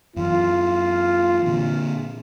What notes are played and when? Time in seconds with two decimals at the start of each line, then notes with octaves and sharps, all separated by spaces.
0.16 F#2 E3 F4
1.46 A#2 D3